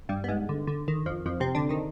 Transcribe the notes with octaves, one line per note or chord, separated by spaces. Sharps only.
G2 G3
B3
G#2 G#3
D3
D3
D#3
F2 F3
F2 F3
C3 C4
D3 D4
D#3 D#4